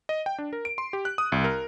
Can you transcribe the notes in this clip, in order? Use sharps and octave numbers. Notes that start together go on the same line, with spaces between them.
D#5
G5
D4
A#4
D7
C6
G4
F#6
D#6
C2
A#4